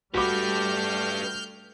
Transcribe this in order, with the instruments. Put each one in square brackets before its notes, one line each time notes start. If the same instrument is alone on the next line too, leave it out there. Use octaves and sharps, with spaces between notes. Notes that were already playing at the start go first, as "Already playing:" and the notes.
[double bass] G3 A3 [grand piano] F#4 D6 [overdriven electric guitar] G4 B4 [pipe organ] F6 G6